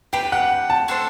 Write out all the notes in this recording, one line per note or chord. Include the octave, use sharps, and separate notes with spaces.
D4 G4 B4 G5
F#5
A5
A3 D4 A4 C5